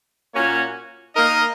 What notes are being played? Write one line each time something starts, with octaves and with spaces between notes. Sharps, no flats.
A#2 A#3 C#4 F#4 C#5
A#3 D#4 A#4 D#5